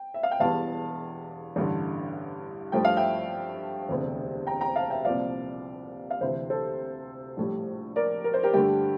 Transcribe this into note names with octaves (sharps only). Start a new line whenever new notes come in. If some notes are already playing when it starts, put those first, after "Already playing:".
Already playing: G5
E5
F5
G5
E1 E2 E3 G3 F5 A5
A1 G2 D3
G2 F3 A3 G5
F5
E5 G5
E1 D2 C3
G5 A#5
G5 A#5
F5 A5
E5 G5
C2 A#2 F3 C4 D5 F5
F5
D2 C3 E3 C5 E5
A4 C5
A#1 A2 G3
A#4 D5
A#4
C5
G4 A#4
G2 D3 A3 G4